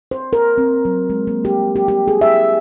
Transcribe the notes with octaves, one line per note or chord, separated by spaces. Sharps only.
C5
A#4
C4
F#3
G#3
A#3
G4
G4
G4
G#4
E5